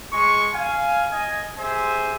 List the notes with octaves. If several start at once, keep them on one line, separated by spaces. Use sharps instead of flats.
G#3 C#6
F5 G#5
D#5 G#5
G4 G#4 C5 E5 G#5